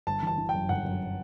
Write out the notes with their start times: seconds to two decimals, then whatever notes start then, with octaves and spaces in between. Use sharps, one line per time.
0.07 G1 A5
0.22 E3 A5
0.38 E3
0.49 F#2 G5
0.69 G1 F#5
0.85 F#2